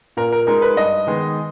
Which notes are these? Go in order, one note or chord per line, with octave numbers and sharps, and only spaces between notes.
A#2 A#4
A#4
G#3 D#4 A#4
B4
G2 D#5
D#3 G#3 B3